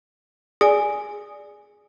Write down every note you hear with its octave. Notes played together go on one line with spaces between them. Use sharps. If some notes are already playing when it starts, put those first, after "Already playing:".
G#4 D5 G#5